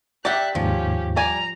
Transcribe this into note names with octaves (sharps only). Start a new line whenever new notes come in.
G4 D5 E5 F#5 G5 A#5 F#6
D#2 G#2 F3 C#4 G4
G3 D5 G#5 A#5